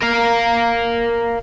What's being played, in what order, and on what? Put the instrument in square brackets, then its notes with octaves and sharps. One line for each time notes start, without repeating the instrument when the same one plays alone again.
[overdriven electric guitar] A#4 F5